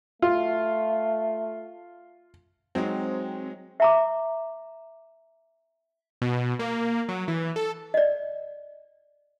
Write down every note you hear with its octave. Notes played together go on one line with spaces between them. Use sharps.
A3 F4
F#3 G#3 C4 D#4
E5 A#5 D6
B2
A#3
F#3
E3
A4
D5 D#5